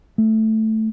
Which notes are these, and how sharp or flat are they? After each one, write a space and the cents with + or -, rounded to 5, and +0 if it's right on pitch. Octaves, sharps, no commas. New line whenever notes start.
A3 +0